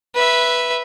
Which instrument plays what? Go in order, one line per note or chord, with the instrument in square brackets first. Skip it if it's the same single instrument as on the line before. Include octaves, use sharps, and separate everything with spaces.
[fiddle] B4 E5